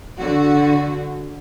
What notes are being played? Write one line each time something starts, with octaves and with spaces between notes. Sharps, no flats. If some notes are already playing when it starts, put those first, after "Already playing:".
D3 F#4